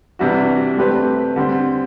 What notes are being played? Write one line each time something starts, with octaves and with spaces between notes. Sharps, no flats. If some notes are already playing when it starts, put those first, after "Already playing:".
C3 E3 G3 D4 F#4
A3 C4 G4 B4
D3 G3 C4